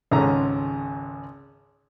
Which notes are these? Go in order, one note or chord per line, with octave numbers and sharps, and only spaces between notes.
G#1 C#2 G#2 C#4 A4 A#5